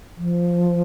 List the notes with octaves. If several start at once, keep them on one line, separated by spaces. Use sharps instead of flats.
F3